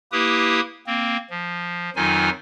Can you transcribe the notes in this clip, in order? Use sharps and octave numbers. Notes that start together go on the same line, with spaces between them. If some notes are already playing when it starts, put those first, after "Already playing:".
A#3 E4 G4 B4 D#6
A#3 C4
F3
F2 D#3 F#3 D#4 F4 G#5